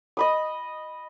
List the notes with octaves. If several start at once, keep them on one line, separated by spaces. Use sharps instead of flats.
D#5 B5 D#6